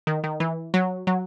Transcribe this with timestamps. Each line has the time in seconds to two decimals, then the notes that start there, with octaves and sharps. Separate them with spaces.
0.07 D#3
0.24 D#3
0.40 E3
0.74 F#3
1.07 F#3